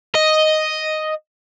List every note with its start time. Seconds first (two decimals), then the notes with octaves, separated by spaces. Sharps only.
0.15 D#5